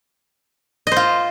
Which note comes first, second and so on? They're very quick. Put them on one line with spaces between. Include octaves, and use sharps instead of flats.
D#5 C5 F4